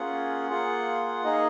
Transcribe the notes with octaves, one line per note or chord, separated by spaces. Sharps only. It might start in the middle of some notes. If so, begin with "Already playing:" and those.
Already playing: A#3 C#4 F4 G#4 F#5
A#3 F4 G#4
A#3 D#4 G#4 D#5